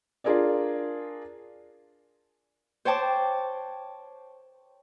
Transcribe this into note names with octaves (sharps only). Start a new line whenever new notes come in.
D4 F4 G#4 A#4 D5
C5 C#5 G5 A5 D6